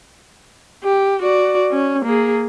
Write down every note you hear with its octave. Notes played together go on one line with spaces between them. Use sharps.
G4
F#4 D5
C#4
A#3 G#4